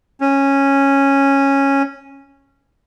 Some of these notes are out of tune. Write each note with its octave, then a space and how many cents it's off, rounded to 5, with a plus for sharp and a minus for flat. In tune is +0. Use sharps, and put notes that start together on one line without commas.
C#4 -10